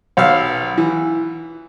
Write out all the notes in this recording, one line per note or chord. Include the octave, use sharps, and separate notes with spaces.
B1 F5 E6
E3